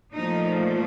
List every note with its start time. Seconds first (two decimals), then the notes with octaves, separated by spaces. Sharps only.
0.14 A#2 F3 A3 D#4